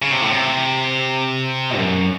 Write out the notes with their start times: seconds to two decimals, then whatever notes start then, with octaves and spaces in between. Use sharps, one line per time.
0.02 C#3
0.12 C3
0.21 A2
0.31 C3
1.77 F#2